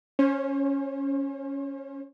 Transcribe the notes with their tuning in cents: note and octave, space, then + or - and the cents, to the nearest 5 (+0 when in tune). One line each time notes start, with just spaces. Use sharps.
C#4 +0 C5 +40